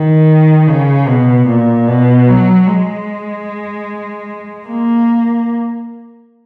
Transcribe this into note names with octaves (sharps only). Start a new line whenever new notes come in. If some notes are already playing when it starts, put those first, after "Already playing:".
Already playing: D#3
C#3
B2
A#2
B2
F#3
G#3
A#3